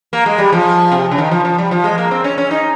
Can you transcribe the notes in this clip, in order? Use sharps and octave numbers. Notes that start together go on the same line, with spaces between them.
A#3
G#3
G3
F3
C3
C#3
D#3
F3
F3
G3
F3
G#3
A#3
C4
C#4
C#4
D#4